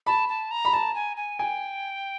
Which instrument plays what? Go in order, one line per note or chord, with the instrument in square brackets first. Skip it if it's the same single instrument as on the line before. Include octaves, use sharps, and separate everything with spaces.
[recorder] A5 [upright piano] B5
[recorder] A5
A#5
[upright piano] B5
[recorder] A5 [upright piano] A#5
[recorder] G#5
G#5
[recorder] G5 [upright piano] G#5